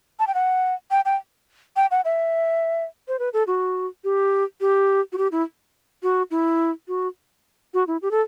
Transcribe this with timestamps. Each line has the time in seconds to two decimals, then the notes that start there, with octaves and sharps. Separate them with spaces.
0.20 A5
0.27 G5
0.35 F#5
0.91 G5
1.05 G5
1.76 G5
1.91 F#5
2.05 E5
3.08 C5
3.19 B4
3.33 A4
3.47 F#4
4.04 G4
4.61 G4
5.13 F#4
5.18 G4
5.32 E4
6.03 F#4
6.31 E4
6.88 F#4
7.74 F#4
7.87 E4
8.02 G4
8.11 A4